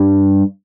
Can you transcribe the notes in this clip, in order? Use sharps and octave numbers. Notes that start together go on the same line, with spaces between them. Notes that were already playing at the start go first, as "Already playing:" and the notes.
Already playing: G2 G3